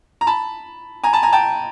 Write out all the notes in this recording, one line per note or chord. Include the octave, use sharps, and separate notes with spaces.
A#5
A5 B5
G#5 A#5
A5 B5
G#5 A#5
G5 A5